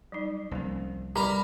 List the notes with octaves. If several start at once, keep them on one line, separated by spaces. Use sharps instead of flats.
F#3 G3 D#4
C2 F3 A#3 C#4
G3 A#4 A#5 B5